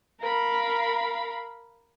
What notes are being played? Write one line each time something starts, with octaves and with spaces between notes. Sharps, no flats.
A#4 F5 B5